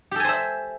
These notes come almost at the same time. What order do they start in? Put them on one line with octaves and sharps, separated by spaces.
G4 A4 G#5 C5 E5